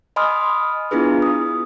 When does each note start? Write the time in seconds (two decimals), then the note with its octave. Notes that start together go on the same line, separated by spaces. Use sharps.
0.16 D#5 G#5 B5 C6 D#6 F6
0.91 B3 D4 E4 F4 G#4 B4
1.22 D#6